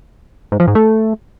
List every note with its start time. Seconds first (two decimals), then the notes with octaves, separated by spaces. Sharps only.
0.52 G#2
0.60 F3
0.68 G#2
0.75 A3